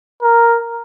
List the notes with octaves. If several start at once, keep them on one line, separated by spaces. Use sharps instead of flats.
A#4